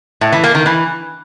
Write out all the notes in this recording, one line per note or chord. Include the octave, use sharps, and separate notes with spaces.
A2
E3
A#3
D#3
E3